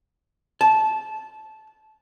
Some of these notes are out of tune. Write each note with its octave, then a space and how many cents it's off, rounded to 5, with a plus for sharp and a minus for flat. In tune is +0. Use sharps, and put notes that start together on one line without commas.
A5 -15